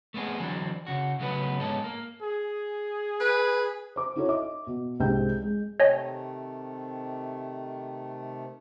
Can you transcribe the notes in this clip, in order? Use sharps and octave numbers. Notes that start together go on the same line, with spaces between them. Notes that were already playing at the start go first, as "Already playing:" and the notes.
A3 B3 C4 E4 G#4
D3 E3 F#3 C4 D4
C#3 F#4
C#3 F#3 A3 B3 G#4 B4
G#2 B3 C#4 D#4 A4
A#3
G#4
B4
C5 D6
D#4 E4 F#4 A4 C#5
D#5 E5 D6
B2
C2 G#2 C4 D4 G5 G6
G#3
C3 D#3 A3 C#5 D#5 G#5